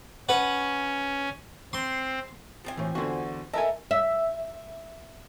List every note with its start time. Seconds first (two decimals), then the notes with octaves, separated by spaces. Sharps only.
0.29 C#4 B4 F#5
1.73 C4 C6
2.65 F3 C4 G#5
2.77 A2 E3
2.95 E2 D3 F#4 C5
3.54 A4 A#4 D#5 E5 G#5 A5
3.91 E5